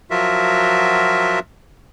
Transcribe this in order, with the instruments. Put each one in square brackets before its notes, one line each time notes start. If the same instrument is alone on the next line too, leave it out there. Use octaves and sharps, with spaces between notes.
[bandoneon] F3 F#3 F4 F#4 A#4 E5